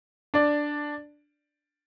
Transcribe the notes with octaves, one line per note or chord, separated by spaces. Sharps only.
D4 D5